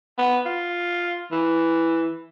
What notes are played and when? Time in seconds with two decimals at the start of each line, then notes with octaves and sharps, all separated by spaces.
0.18 B3
0.46 F4
1.31 E3